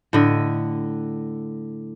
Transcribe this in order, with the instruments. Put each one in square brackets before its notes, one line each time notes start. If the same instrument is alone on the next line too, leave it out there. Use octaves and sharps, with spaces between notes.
[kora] A2 D3 D#5